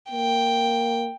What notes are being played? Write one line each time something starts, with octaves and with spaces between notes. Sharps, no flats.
A#3 G5